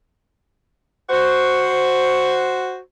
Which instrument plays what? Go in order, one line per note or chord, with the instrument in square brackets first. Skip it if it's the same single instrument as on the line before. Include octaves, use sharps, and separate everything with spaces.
[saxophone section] F#4 C5